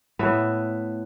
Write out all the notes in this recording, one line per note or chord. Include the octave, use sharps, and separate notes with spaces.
A2 B3 B4 E5